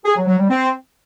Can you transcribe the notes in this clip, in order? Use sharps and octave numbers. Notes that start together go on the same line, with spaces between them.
G#4
F#3
F#3
G3
C4